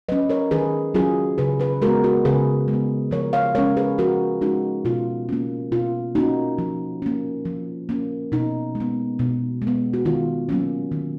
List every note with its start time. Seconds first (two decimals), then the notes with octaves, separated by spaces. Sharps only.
0.09 F#3 C#4 B4 D#5
0.29 A#4 C#5
0.51 D#3 G#4 B4
0.94 F#3 C#4 F4 G#4
1.38 C#3 G#4 B4
1.60 G#4 B4
1.82 G#3 B3 F#4 A#4
2.04 F#4 A#4
2.25 C#3 G#4 B4
2.68 G#3
2.73 B3
3.11 F3 A#4 C#5
3.33 C#5 F5
3.55 G#3 C#4 A#4 C#5
3.77 G#4 B4
3.98 F3 F#4 A#4
4.41 G#3 C#4 D#4 F#4
4.85 B2 F4
5.29 A#3 C#4
5.72 B2 F4
6.15 A#3 C#4 D#4 F#4
6.58 F3
7.02 A#3 C#4
7.45 F3
7.89 A#3 C#4
8.32 B2 D#4
8.75 G#3
8.80 B3
9.19 B2
9.62 G#3
9.67 B3
9.94 F#4
10.05 D#3 F4
10.49 F#3 A#3 C#4
10.92 D#3